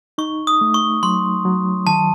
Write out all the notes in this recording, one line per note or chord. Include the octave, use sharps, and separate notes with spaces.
D#4 C#6
D#6
A3
C#6
F#3 C6
F#3
D#3 A5